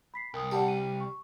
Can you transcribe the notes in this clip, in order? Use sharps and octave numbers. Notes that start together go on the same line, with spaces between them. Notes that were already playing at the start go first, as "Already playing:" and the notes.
B5 B6 C7
C2 A#4 D#6
G3 D5 F#5 A5
D#7
C#6